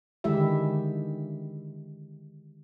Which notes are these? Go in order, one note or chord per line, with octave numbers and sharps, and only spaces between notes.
D3 D#3 G#3 E4 G4 E5